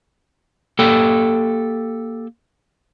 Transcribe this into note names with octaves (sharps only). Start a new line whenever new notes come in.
A#3 G4 A4 G5